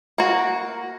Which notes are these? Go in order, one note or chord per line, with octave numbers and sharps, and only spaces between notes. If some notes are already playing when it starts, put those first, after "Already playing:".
A#3 F#4